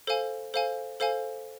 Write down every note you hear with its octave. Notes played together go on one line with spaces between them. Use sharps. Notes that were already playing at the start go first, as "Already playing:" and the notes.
A4 C5 F5 G#5
A4 C5 F5 G#5
A4 C5 F5 G#5